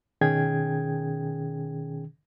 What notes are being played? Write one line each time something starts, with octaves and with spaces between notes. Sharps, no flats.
B2 D#3 C#4 G#4 G5 G#6